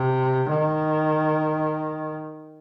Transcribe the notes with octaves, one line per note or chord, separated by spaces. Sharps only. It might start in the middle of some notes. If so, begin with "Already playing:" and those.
Already playing: C3
D#3